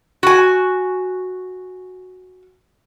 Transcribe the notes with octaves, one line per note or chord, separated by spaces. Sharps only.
F#4 G#5